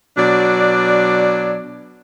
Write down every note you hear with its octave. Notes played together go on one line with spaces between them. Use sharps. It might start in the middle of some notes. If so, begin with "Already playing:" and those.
B2 F#3 D4 D5